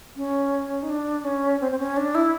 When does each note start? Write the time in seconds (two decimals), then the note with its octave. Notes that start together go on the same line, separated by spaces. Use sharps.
0.17 C#4
0.83 D#4
0.89 D4
1.24 C#4
1.61 C4
1.72 C4
1.79 C#4
1.97 D4
2.15 E4